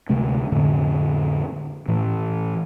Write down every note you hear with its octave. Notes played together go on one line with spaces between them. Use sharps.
D2 C3 G#3 A3
F2 A2 D3
A2 E3